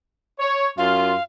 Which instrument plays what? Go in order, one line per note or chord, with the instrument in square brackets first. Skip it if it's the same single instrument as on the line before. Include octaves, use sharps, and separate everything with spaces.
[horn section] C#5
[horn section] F#2 F4 [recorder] F5